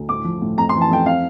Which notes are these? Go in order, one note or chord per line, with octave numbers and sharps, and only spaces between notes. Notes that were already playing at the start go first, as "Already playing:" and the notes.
Already playing: D2
A2 D6
F3
A2
F2 A#5
C6
E3
A5
F2 G5
C4 F5